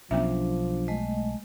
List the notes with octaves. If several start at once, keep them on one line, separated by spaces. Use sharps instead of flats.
B1 F3 B3 C#4 D4 E5
G#3 A3 D#5